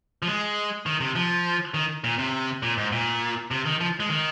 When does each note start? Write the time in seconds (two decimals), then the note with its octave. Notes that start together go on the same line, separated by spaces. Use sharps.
0.22 F3
0.27 G#3
0.86 D#3
1.00 C3
1.15 F3
1.74 D#3
2.04 A#2
2.19 C3
2.63 A#2
2.77 G#2
2.92 A#2
3.51 C3
3.65 D#3
3.80 F3
4.00 G#3
4.09 D#3